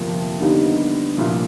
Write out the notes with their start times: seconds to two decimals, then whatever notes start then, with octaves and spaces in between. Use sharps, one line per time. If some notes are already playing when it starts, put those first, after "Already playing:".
Already playing: G1 F2 C3 F3 A#3
0.40 D#2 D3 G3 B3 D#4
1.17 C2 A#2 F3